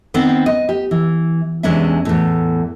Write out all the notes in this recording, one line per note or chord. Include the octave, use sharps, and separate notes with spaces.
D#3 B3 C4 C5
D#5
G4
E3
E2 C3 G#3 C#4 D4 E5
E2 A2